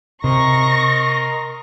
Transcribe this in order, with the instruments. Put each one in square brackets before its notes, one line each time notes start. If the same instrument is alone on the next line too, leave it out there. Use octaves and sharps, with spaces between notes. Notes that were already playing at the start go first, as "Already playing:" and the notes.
[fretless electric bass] C3 [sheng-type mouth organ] A#4 D#5 C6 [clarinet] A#5 [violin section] C#6 A#6